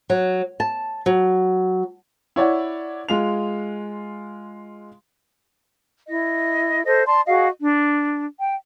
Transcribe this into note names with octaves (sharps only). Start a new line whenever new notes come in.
F#3
A5
F#3
E4 C#5 D5 F#5
G#3 F4 F7
E4 D#5
A4 C5 D#5
D5 A5 C6
F#4 G#4 D#5 F5
D4
G5